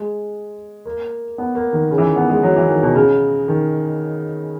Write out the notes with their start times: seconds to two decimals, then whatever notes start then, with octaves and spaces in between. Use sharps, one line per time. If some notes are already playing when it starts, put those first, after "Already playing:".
Already playing: G#3
0.86 A#3
1.38 B3
1.55 A#3
1.73 D#3
1.91 C#3
1.98 E3
2.04 D#3
2.16 B3
2.29 G#3
2.43 F#3
2.56 E3
2.69 D#3
2.83 B2
2.95 C#3
3.48 D#3